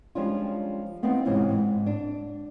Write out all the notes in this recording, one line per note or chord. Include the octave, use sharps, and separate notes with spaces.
F3 G3 G#3 C#4 D4 F4
B3 C4 D#4 E4 B4 F5
G#2 C3 E3 F3 C#4
G#2
D4